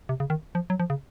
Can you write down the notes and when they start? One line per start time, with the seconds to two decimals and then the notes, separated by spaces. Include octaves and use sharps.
0.09 C3
0.20 C#3
0.30 D#3
0.55 F3
0.70 F#3
0.80 F3
0.90 C#3